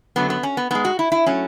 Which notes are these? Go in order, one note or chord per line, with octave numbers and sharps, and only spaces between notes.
F#2 D3 F#3 A3 B3
B3
C#4
B3
G#2 G#3 B3
F#4
E4
E4
F#3 A3 C#4